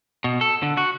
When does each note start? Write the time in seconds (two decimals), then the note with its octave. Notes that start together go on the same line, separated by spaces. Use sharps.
0.24 B2
0.41 A4
0.63 D3
0.77 F#4